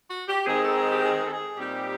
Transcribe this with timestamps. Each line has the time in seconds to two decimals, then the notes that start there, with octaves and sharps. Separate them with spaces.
0.09 F#4
0.28 G4
0.46 D#3 G#3 C4 D#4 G#4
0.60 A4
0.74 G#4
0.89 G4
1.02 G#4
1.26 A4
1.30 G#4
1.58 A#2 G3 C4 D#4 G4